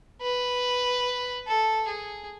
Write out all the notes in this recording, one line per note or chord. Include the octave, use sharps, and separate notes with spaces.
B4
A4
G#4